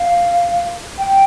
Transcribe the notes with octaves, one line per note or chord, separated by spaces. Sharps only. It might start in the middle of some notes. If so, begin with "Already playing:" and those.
Already playing: F5
G5